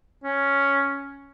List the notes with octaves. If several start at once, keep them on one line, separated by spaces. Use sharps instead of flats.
C#4